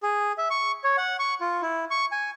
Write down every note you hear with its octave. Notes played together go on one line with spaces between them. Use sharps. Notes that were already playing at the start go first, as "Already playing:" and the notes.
G#4
E5
C#6
C#5
F#5
C#6
F4
E4
C#6
G#5